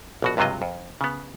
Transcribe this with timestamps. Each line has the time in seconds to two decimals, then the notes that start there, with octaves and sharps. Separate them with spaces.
0.22 A#1 B2 F#4
0.37 C#2 G2 C3 F#3 F4 D#5
0.62 F2
1.01 C#3 B3